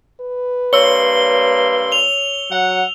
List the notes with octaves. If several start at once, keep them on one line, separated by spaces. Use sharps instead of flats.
B4
G2 A#3 C#5 C6 E6 G7
F7 G7
F#3 F#5